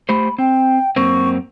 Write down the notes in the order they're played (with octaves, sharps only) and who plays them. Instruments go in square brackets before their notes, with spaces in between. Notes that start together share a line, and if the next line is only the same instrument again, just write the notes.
[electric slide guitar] A3 G4 C5 [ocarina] B5
[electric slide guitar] C4 [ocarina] G5
[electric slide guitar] F#2 A#3 C4 [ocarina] C#6